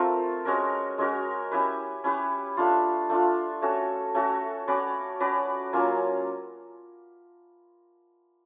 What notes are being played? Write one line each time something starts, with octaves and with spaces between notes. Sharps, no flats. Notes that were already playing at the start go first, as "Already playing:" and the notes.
Already playing: A3 C4 F4 A#4
G#3 C#4 F#4 A#4
G#3 C#4 F#4 A#4
C#4 E4 G4 B4
C#4 E4 G4 B4
A3 D4 F4
A3 D4 F4
A3 C#4 F#4 A4
A3 C#4 F#4 A4
C#4 F#4 B4 D5
C#4 F#4 B4 D5
F#3 A#3 C#4 F4